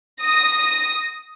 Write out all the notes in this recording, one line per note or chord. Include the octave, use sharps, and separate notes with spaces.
D#6 A#6